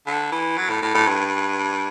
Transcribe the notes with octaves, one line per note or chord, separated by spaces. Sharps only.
D3
E3
F#3
A2
A2
A2
G2